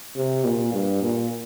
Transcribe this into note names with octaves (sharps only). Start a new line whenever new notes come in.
C3
A#2
G2
A#2